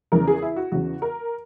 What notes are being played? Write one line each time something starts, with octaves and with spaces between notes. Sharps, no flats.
E2 C#3 E3 A#4
G#4
E4
F#4
E2 C#3 E3 F#4
A#4